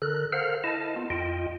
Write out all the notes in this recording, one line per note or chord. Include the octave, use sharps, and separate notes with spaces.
D3 A4 A#4 F#6
A4 A#4 C5 F5 F#5 F6
E4 D#5 A5
B3 F4
F2 F4 D#5 G5